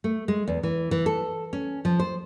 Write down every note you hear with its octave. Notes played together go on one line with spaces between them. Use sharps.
A3
G#3
E2
E3
E3
A4
C#4
F3
C5